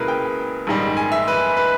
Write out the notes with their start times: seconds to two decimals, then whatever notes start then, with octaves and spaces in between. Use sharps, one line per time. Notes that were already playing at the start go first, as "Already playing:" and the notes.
Already playing: C#2 B2 A#3 E4 G#4 A#4 B4
0.08 G5
0.67 A#1 G#2 D#3 G3
0.97 G#5
1.12 E5
1.28 B4
1.57 B4